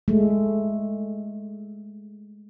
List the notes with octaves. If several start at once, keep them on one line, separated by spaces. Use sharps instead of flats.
G#3 A3